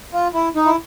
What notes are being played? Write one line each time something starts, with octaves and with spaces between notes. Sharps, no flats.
F4
E4
D#4
E4